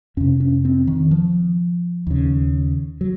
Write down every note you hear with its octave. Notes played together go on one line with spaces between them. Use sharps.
F2 C3 C#4
C#4
C4
D#3
F3
D#2 C#3
F#3